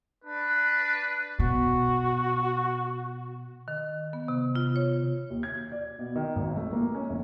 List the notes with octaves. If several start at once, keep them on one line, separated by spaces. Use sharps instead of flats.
D4 B4
B2 F#4
D#3
B3
C3
F4
C#5
D#2
G#6
D5
B2
D#3
G#1
A3
A#3
C#4
F1